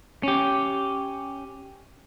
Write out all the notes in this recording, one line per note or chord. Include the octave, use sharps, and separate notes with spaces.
C#4 G4